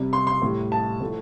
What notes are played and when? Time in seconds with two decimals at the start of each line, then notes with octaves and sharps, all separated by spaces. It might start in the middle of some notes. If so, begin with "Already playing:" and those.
Already playing: C3 G3
0.13 C6
0.27 C6
0.42 A2 G3
0.72 A5
1.00 A2 F3 A3